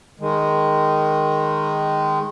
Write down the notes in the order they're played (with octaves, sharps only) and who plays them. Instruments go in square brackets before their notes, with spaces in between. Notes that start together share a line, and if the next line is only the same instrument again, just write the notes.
[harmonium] D#3 G#3